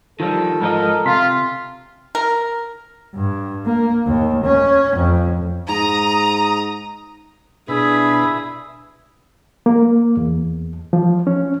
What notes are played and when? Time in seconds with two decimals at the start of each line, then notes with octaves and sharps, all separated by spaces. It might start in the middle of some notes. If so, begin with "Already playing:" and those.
0.20 D#3 F3 G3 F4 A4
0.62 G#2 F3 A#4 D#5
1.06 C3 F4 C6 B6
2.15 A#4
3.15 G2
3.65 A#3
4.07 D#2
4.44 C#4
4.96 F2
5.69 G#2 A#5 D#6
7.68 B2 D4 E4 G#4 B4 E5
9.66 A#3
10.17 E2
10.93 F3
11.27 C#4